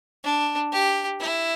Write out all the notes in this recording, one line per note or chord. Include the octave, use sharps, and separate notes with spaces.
D4
G4
E4